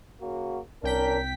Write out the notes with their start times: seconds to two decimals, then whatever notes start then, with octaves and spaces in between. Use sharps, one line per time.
0.21 C#3 A#3 F#4
0.83 C2 C#4 D4 A#4 G5 B6